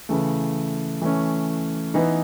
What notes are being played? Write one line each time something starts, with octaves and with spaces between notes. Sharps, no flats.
C#3 E3 A3
E3 A3 C#4
E3 B3 D#4